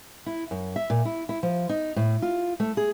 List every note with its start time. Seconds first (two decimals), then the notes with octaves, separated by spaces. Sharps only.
0.26 E4
0.51 F#2
0.76 E5
0.90 A#2
1.05 E4
1.29 E4
1.43 F3
1.69 D#4
1.96 A2
2.22 F4
2.60 A3
2.77 G#4